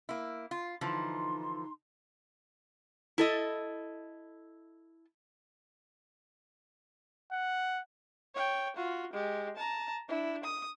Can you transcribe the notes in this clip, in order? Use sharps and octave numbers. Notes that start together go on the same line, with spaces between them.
A#3 E4
F4
D3 E3 F3 D#4 C6
E4 A4 D#5
F#5
C#5 G5
F4 F#4
G#3 G4
A5 A#5
D4 E4
D#6